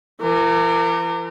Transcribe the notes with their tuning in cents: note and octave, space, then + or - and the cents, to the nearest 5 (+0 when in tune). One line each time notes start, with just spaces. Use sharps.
E3 +45 A#4 -30